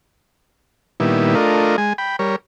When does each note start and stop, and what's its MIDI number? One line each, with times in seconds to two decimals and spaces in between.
1.00 1.35 46
1.00 1.35 51
1.00 1.35 55
1.00 1.35 59
1.00 1.35 64
1.35 1.76 57
1.35 1.76 62
1.35 1.76 65
1.35 1.76 70
1.35 1.76 75
1.78 1.93 56
1.78 1.93 80
1.98 2.16 79
1.98 2.16 83
2.19 2.36 55
2.19 2.36 70
2.19 2.36 73